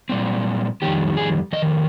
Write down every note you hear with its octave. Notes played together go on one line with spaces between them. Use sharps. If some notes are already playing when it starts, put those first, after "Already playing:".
A#2 G3 C4
F2 D#3 G3 G4
G#4
F2 D#3 D#5